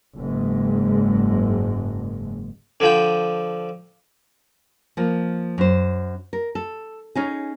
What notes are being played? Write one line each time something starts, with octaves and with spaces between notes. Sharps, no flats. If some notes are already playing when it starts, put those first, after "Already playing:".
F#1 G#2
D3 F3 G5
F3 A#3
F#2 C5
A#4
A4
C#4 D#4 G#4